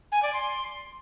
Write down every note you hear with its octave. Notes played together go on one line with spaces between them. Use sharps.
G#5
D5
C6